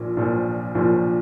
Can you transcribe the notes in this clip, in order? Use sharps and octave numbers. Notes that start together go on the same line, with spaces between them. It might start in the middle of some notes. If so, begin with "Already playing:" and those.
Already playing: A#1 A#2 F3
A#1 A#2 F3
A#1 A#2 F3